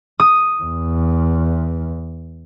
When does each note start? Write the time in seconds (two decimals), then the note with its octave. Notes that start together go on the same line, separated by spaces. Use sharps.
0.20 D#6
0.62 E2